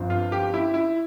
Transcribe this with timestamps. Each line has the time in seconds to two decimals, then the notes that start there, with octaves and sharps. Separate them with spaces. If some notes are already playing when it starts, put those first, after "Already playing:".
Already playing: G1 G2 F3 C4
0.10 F4
0.32 G4
0.54 E4
0.74 E4